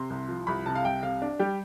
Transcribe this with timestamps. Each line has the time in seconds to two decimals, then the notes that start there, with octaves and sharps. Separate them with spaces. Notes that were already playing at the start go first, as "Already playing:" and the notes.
Already playing: C3 C6
0.10 C2
0.28 F3
0.47 C2 B5
0.66 C3 A5
0.75 F5
0.84 C2 G5
1.03 C3 F5
1.22 D4
1.39 G3 G4